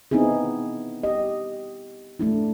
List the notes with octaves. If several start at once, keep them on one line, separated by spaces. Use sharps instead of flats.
B3 C4 D#4 E4 G#4
G4 D#5
A3 D4 E4